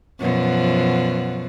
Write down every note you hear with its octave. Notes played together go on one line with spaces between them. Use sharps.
F#2 B2 F3